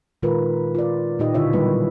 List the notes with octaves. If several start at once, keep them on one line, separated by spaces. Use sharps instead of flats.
A#2 D#3 G#3 F4 A#4 B4
F4 D5
A#2 D#4 G4 D#5
B2 D3 E4 F4 C#5 E5
A#2 D#3 F#3 G3 A#3 B4